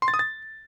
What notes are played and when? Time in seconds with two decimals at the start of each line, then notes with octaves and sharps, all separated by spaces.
0.02 C6
0.08 A6
0.14 D#6
0.19 A6